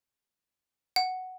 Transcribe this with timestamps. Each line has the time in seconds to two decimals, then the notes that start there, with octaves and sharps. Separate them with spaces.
0.96 F#5